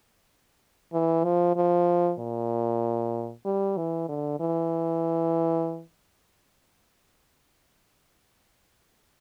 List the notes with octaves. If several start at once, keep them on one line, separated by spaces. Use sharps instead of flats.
E3
F3
F3
A#2
G3
E3
D3
E3